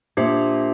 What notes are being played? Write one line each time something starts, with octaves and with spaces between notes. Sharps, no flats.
A#2 D4 G4 C5 E5